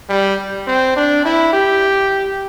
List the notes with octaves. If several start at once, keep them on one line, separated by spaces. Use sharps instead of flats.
G3
C4
D4
E4
G4